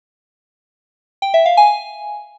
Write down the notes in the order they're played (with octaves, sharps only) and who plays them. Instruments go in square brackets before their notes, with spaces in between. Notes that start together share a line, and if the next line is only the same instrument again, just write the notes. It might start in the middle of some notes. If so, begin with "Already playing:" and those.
[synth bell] G5
E5
F5
G#5